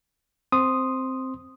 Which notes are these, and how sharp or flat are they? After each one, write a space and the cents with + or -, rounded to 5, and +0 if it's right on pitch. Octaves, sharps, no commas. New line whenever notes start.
C4 +0 C6 +0 D#6 -5